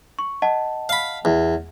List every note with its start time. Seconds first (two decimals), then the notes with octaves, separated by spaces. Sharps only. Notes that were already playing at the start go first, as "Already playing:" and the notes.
0.19 C#6
0.42 D#5 F#5 A5
0.89 F5 B5
1.25 E2